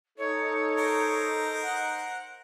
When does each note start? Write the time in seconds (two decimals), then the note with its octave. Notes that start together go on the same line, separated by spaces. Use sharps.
0.18 D#4 A4 C#5
0.78 A#4 C5
1.63 F#5